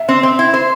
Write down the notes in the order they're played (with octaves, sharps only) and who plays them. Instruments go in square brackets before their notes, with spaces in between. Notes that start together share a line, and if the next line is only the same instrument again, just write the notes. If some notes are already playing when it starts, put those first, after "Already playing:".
Already playing: [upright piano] E5
[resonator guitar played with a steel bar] C4
C4
E4
C5